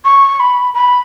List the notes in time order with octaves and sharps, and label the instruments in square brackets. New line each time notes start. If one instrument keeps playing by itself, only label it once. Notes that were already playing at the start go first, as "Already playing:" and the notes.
[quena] C#6
B5
B5